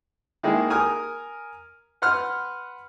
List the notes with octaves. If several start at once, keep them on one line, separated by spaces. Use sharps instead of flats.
D#3 G#3 A#3 E4 G#4
A#4 G#5 A#5 D#6 F6
B4 F#5 C6 F6